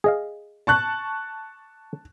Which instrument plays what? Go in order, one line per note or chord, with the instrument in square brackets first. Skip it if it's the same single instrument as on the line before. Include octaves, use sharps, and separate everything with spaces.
[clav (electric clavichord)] G#4 D#5 F5
[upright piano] A5 C#6 F#6